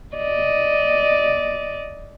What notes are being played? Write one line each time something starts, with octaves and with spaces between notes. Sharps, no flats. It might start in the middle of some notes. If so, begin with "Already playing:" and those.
D5 D#5